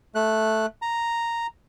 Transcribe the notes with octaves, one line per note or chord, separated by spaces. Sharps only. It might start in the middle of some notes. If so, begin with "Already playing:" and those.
A3 F#6
A#5